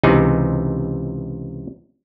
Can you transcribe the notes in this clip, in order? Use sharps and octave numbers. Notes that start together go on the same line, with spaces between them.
C#2 C3 E3 D#4 G#4